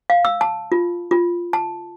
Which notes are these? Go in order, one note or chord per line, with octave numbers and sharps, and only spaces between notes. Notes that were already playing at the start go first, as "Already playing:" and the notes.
F5
E6
A5
F4
F4
A5